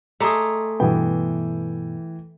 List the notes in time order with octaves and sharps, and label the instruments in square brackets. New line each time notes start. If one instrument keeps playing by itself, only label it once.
[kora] A3 G#4 [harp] D5 A#5 C6 [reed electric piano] D#5
[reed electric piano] G2 B2 B3 [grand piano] E3 G5